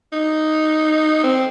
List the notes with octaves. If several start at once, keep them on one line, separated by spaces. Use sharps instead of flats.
D#4
C4